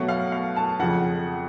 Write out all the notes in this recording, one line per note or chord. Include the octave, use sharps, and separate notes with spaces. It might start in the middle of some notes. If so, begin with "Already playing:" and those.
Already playing: B2 F#3 A3 F#5
F5
F5
A5
F2 C#3 F3 F#5